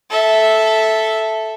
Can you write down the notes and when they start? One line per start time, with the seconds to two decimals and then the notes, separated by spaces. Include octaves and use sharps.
0.10 A4 E5